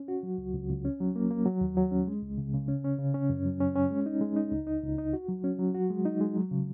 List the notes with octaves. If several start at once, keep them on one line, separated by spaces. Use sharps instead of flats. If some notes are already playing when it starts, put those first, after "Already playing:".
Already playing: C#4
F#4
F#3
C#2
C#2
C#2
C#4
F#3
A#3
A#3
F#3
D#2
F#3
C#4
G#3
C#2
C#3
C#3
C#4
C#4
C#3
C#4
F#2
F#3
C#4
C#4
G#3
D#4
G#3
D#4
C#2
D#4
C#2
D#4
F#4
F#3
C#4
F#3
F#4
G#3
D#4
G#3
F#3
C#3